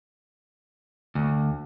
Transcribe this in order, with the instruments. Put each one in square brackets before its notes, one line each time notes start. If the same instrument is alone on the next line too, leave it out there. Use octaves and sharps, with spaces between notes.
[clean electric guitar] D2